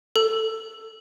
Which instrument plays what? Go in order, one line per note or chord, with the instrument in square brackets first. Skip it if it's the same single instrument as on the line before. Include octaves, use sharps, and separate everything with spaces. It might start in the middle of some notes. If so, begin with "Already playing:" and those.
[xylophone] A4